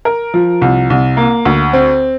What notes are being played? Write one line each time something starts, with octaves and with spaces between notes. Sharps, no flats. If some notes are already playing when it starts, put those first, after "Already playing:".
A#4
F3
C2
C2
A#3
D2
C4